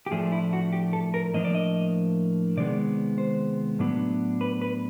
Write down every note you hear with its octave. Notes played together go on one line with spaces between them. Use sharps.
G4
A2 F3 A3 D4 G#4
E4
F#4
G4
A4
A#4
A2 F3 A#3 D4 D#5
D5
D#5
C3 D#3 G#3 B3 D5
C5
A2 F#3 B3 D4
B4
B4